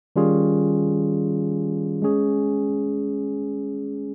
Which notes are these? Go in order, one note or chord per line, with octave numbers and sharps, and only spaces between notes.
D#3 G3 C#4 F4 G#4
G#3 C#4 G#4